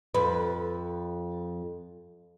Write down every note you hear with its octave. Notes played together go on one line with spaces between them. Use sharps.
F2 B4